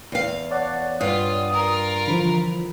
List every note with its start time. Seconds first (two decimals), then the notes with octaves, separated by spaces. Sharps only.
0.12 E2 F5
0.51 C#5 D5 F#5 A5
1.01 G2 F4 D#6
1.52 F4 A#4
2.07 D3 E3 F3 B5